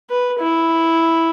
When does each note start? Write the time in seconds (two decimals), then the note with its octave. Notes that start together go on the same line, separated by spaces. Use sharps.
0.10 B4
0.40 E4